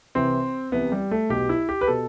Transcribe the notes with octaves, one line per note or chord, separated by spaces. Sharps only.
C2 C3 E3 C4
C2 C3 E3 B3
G3
A3
B1 B2 G4
E4
G4
B4
B2 A4